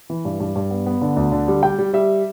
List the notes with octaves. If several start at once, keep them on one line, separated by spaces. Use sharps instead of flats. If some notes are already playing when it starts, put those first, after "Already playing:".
E3
G2
G2
G2
B3
B3
D3
D2
D3
G3
G3 G5
G3
G3 E5